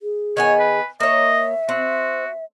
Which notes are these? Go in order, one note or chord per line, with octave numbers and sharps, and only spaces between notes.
G#4
D#3 B3 C#5 G#5
B4
A#3 C#5 D#5 E5
C4 F#4